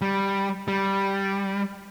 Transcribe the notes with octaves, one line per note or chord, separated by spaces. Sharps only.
G3
G3